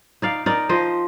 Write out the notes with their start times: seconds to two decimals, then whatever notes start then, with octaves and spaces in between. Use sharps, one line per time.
0.22 D#4 D5 F5
0.46 D#4 A#4 D5
0.69 F3 C5 D#5